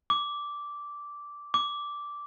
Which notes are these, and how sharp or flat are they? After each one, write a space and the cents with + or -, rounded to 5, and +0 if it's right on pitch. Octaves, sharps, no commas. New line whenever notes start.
D6 -10
D6 -10